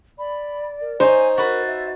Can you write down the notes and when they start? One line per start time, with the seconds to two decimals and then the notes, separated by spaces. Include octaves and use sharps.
0.18 D5 B5
0.81 A#4
1.00 D#4 C5 C#5 G#5
1.38 F#4 A#4 B4 A6
1.67 E5